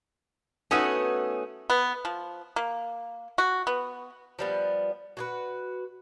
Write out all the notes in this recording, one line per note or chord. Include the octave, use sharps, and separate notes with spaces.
A3 B3 C#4 D#4 F#4 G#5 D#6 E6
B3
F3
A#3
F#4
B3
F3 G3 B3
F#4 G#4 B4